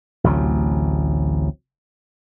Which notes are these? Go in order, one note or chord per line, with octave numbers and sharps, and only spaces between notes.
A1 D2 C3 F#3